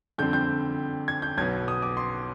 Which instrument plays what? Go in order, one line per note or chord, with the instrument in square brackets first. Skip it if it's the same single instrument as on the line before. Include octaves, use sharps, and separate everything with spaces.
[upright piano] F2 D3 G3 C4 G6
G6
G#6
G6
B1 B2 B3 G#6
D#6
D6
C6